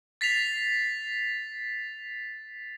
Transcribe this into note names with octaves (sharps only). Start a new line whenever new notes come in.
A6 B6 C7 F7